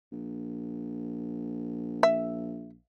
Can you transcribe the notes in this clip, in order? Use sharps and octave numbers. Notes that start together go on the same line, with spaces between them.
A#1
E5